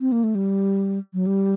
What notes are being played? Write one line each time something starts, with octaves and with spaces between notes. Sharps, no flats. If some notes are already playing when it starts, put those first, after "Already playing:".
C4
A#3
A3
G3
F#3
G3